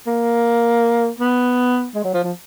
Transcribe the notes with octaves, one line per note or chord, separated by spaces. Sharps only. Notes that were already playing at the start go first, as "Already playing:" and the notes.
A#3
B3
G#3
F#3
F3
F3